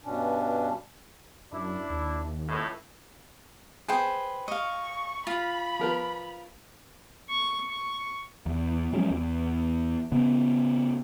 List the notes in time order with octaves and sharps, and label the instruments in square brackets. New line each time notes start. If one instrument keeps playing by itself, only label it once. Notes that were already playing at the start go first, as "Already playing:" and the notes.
[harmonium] G2 B2 C#4 D4
[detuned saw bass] F#2 [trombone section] D4 E4
[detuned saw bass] D#2
[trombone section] C#2 A2
[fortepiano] G#4 [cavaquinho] B4 C5 G5
[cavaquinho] D#5 F5 [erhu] C#6
[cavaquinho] F4 [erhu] B5
[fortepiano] F3 A#4 B4
[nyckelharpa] C#6
C#6
[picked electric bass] E2
F3 F#3 G#3 C#4
E2
C#3 B3